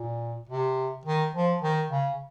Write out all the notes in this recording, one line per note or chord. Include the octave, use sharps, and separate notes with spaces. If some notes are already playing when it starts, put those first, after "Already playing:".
Already playing: A#2
C3
D#3
F3
D#3
C#3